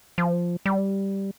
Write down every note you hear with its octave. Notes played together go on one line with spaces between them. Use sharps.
F3
G3